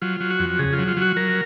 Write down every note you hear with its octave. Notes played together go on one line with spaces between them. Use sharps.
F#3 F4
F#3
F#4
F2
C#3 G#4
F4
F#3
F4
F#3 F#4
F#3 A#4